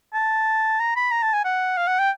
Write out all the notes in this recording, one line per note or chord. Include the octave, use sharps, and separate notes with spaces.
A5
A#5
B5
A#5
A5
G#5
F#5
F5
F#5
G5